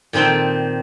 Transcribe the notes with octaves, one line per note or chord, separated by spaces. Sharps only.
A#2 D#3 C4 G5 A5